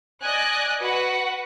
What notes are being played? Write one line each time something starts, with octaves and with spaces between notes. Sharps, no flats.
D5 D#5 G#5 F#6
F#4 B4 F#5